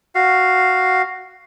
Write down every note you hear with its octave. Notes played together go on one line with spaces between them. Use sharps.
F#4 F5